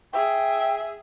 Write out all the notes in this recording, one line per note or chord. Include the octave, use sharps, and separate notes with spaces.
G#4 E5 G5